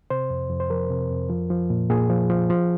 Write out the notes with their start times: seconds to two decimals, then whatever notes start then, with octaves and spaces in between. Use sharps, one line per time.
0.10 C3 C5
0.30 F2
0.50 F2
0.60 C5
0.70 F3 A#4
0.90 C3
1.11 F2
1.30 F3
1.50 F3
1.70 A#2
1.90 A#2 G#4
2.10 F3
2.30 F3
2.50 F3